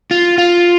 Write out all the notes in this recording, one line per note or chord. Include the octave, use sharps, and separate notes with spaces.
F4
F4